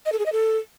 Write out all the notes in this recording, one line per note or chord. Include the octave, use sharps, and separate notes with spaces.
D#5
A4
G#4
D#5
A4